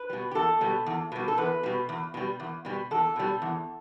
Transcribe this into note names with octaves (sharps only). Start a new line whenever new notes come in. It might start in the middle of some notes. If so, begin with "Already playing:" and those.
Already playing: B4
B2 G3
G4
E2 A4
B2 G3
E2
B2 G3
A4
E2 B4
B2 G3
E2
B2 G3
E2
B2 G3
E2 A4
B2 G3
E2